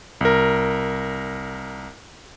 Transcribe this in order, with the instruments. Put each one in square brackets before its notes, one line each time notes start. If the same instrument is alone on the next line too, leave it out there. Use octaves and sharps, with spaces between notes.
[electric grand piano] C2 A#4